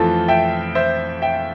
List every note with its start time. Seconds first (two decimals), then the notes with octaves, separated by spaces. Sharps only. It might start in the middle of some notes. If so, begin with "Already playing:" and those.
Already playing: F2 E3 A3 C4 F4 A4
0.28 E5 G5
0.75 C5 E5
1.22 E5 G5